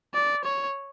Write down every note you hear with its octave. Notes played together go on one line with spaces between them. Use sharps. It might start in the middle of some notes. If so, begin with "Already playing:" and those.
D5
C#5